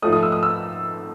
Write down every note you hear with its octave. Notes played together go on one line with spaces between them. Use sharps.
G#2 F3 A3 D#6
D#6
E6
D#6
E6